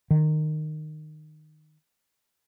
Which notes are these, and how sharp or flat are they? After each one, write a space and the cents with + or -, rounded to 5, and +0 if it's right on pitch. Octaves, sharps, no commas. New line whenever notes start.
D#3 -15